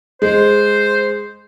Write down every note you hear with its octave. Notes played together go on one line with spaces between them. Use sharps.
G#3 C5